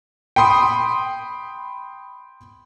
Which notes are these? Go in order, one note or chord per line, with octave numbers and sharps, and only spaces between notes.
G5 B5 C6 D#6